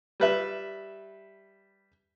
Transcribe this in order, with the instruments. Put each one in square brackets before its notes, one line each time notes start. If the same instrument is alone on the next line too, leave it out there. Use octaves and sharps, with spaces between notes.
[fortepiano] G3 B4 E5